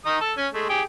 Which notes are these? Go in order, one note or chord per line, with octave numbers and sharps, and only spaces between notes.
D#3 D#4 D#6
A4
C#4 G#5
G#3 A3
G4 G#4 G5